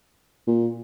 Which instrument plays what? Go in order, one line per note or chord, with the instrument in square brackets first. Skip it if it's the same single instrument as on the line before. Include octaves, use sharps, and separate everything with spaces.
[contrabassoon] A#2